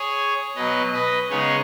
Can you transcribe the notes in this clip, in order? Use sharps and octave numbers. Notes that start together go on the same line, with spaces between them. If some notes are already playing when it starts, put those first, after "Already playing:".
Already playing: G#4 C#5
B2 F#3 B3 B4 D#5
B4 D#5
C#3 G#3 B3 D#4 G#4 C#5